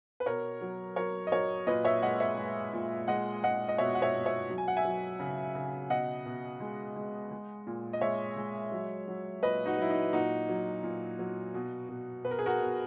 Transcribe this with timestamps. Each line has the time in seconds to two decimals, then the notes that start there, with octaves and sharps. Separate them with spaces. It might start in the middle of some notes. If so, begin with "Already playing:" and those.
0.20 B4
0.26 B2 A#4 C#5
0.61 F#3
0.96 F#3 A#4 C#5
1.27 D#5
1.32 F#3 A#4 C#5
1.67 A#2 B4 D#5
1.85 C#5 E5
2.02 G#3 D#5 F#5
2.20 C#5 E5
2.38 G#3
2.73 A#2
3.08 G#3 D#5 F#5
3.43 G#3 D#5 F#5
3.69 D#5
3.78 B2 C#5 E5
3.95 F#5
4.02 C#5 E5
4.14 B2
4.26 C#5 E5
4.50 F#3
4.58 G#5
4.68 F#5
4.77 E5 G#5
4.85 F#3
5.20 C#3
5.55 C#3
5.90 B2 D#5 F#5
6.26 B2
6.60 G#3
6.96 G#3
7.31 G#3
7.67 A#2
7.93 D#5
8.01 G#3 C#5 E5
8.37 G#3
8.72 F#3
9.08 F#3
9.43 A#2 B4 D#5
9.66 D#4 F#4
9.77 F#3 E4
9.90 D#4
10.13 A#2 D#4 F#4
10.49 F#3
10.83 A#2
11.19 F#3
11.54 B2
11.89 B2
12.25 B2 B4
12.31 A#4
12.39 G#4
12.46 F#4 A#4
12.60 B2